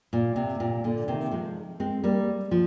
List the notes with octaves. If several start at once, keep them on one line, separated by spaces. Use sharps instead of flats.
A#2
C3
A#2
A#2 D3
C3 D#3
F3 G#3
G#3 C4
G3 A#3
F3